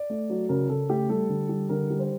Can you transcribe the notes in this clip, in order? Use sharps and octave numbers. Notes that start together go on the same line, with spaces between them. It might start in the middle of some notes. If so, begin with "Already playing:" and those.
Already playing: D5
A3
F#3
C#3 A#4
C#3 A4
A3 G4
G3 A4
D3
G3
D3 A#4
G3
C5